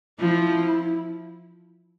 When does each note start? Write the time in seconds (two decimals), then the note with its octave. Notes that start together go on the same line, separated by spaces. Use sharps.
0.20 F3 E4